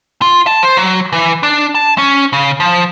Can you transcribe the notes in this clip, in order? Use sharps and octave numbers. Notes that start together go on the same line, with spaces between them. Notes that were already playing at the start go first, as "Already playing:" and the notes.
F4
A5
C5
F#3
E3
D4
A5
C#4
C#3
F3